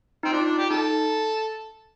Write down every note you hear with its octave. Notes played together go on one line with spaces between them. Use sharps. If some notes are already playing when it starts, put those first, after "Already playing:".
C4 D#4
D4 F4
D4
G4
D#4 A4